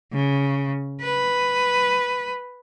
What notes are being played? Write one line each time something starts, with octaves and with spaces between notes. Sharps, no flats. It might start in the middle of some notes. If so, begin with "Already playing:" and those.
C#3
B4